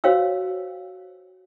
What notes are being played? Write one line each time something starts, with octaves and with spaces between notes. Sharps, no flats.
F#4 C5 C#5 F5 G5 E6